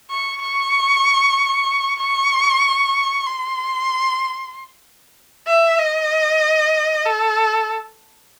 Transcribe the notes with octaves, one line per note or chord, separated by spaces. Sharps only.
C#6
C#6
C#6
C6
E5
D#5
A4